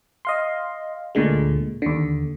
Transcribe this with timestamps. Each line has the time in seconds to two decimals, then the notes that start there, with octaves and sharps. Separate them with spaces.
0.25 D#5 F5 C6
1.15 D2 A#2 D3 G#3
1.82 D#2 D3